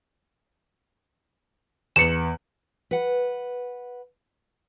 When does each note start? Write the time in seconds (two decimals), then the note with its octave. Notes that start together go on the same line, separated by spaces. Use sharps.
1.96 E2 B3 C#7 E7 F#7
2.91 B4 F#5